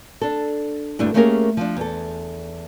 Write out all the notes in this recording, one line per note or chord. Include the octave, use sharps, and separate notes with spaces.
D4 A4
D2 G2 A3 D4 E4
A3 A#3 C#4 G4 G#4 A#4
F3 D4
E2 A4